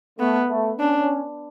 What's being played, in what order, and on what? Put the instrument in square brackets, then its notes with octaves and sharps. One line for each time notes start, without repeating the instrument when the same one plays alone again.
[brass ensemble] A3 [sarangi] B3
[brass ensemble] A3
[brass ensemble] C#4 [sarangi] D4